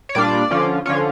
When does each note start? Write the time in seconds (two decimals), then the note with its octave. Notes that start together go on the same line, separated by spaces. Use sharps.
0.09 C#5
0.15 A#2 G3 D4 F4 D5
0.51 D3 F3 C#4 F4
0.86 D3 F3 C#4 F4 C#5